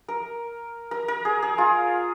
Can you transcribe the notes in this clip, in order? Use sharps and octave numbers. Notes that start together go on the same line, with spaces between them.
A#4
A#4
A#4
G#4
G#4
F4